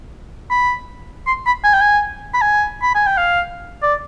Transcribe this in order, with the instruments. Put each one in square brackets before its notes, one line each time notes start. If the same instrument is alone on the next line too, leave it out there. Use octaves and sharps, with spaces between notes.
[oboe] B5
C6
B5
G#5
G5
G#5
B5
G#5
B5
G#5
G5
F5
D5